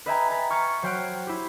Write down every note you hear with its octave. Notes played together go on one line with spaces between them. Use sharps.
B4 D#5 E5 G5 G#5 A#5
A#5 A6 B6
C#6 F6 G#6 A6 C#7
F#3 C5 G5 F6 F#6 D7
E4 G4